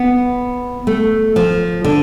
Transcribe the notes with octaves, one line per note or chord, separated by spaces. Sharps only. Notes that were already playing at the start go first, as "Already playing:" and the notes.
Already playing: B3
A3
F3
D3